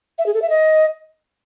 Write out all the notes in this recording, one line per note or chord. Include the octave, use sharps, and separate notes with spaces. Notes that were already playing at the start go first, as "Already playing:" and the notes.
E5
G#4
A4
E5
D#5